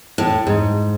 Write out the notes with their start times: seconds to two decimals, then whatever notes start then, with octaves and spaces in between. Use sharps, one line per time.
0.18 A2
0.47 G#2